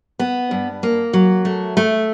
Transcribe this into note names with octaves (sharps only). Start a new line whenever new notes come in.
B3
G2
A#3
F#3
A3
A3